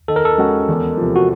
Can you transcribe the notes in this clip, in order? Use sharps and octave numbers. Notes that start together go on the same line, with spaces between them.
D#3 A4
A#4
A4
G#3 C#4 F#4
E2
C3 F3
F#4